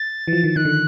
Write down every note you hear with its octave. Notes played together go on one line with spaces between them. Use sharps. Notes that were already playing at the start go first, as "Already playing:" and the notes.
Already playing: A6
E3
F3
D#3
D#3 F#6
D3